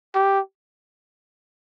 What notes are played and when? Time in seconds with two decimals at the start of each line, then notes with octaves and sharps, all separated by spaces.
0.15 G4